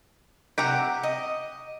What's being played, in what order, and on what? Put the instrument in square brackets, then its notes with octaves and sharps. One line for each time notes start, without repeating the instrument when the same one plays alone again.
[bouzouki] C3 [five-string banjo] G4 F#5 A#5
[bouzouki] D#5